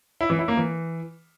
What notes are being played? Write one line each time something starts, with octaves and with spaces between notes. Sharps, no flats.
E4
E3
E4
A#3
E3